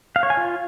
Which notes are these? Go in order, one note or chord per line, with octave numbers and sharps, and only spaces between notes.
F5
C#5
G#5
F4